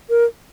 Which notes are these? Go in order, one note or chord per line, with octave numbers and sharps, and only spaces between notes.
A#4